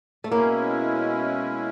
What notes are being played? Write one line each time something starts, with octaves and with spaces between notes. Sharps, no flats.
A3
B2 G#3 A#3 C#4 E4